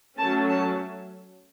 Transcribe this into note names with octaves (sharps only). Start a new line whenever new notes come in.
F#3 A3 C#4 A5
A5